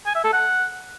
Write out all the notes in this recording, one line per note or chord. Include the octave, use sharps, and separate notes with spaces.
G#5
E5
A4
F#5